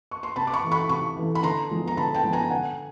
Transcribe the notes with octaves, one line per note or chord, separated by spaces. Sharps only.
C#6
C6
C3 A5 B5
D6
B5 C#6
E3 A3
B5 C#6
C3 B5 C#6
E3 A3
B5
D3 A#5 C6
F3 G#3 B3
A#5
D3 A5 B5
G5 A5
F3 G#3 B3
G#5 A#5
D3 F#5 G#5